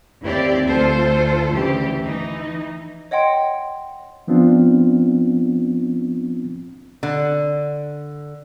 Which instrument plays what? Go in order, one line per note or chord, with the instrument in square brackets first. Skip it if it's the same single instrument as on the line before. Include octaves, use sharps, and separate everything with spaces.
[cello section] D#2 C4 E4 G4 D5
D2 F4 A4 C5
D2 C#3 E3 G4
E3 D#4
[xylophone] C#5 D#5 F#5 G5 C6
[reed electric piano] F3 B3 C4 D4 F4
[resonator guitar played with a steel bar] D3